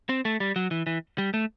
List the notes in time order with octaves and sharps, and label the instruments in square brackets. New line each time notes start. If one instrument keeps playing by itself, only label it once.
[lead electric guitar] C4
A3
G3
F#3
E3
E3
G3
A3